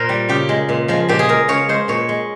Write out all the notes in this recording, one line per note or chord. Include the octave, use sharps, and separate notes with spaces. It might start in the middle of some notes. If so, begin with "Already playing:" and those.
Already playing: A#2 A#4 C5
G3
C#3 G4
G#3
A#2
F3 G#3
A#2 G4
G#4
G#3 A#4
C#3 C#5
G#3 C5
A#2 C#5
G#3